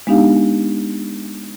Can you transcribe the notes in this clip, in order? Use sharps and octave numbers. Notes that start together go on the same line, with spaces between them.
G#3 B3 D4 D#4 G4 F5